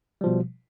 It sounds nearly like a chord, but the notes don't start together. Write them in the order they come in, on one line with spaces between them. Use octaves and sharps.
G3 F3 B2